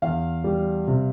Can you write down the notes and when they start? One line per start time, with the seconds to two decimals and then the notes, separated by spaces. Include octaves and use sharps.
0.02 E2 F5
0.44 G3
0.88 C3